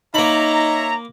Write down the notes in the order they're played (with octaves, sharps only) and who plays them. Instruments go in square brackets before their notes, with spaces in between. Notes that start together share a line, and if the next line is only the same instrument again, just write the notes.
[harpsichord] A#3 B5 [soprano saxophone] D#4 [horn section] C#5 E5 A#5